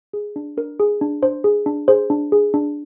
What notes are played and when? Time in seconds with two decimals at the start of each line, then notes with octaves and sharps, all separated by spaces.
0.13 G#4
0.36 D4
0.57 D4 A#4
0.80 G#4
1.01 D4
1.22 D4 C5
1.44 G#4
1.66 D4
1.88 G#4 C5
2.10 D4
2.32 G#4
2.54 D4